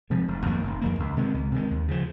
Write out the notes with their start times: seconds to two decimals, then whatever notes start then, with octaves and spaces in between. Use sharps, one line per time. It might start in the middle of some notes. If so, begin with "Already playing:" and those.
0.10 C3 F3 G#3
0.28 F1
0.46 F2 D#3 A#3
0.63 F1
0.81 F2 D#3 A#3
1.00 C#2
1.17 C3 D#3 G#3
1.34 C#2
1.52 C3 D#3 G#3
1.71 D#2
1.88 C#3 F3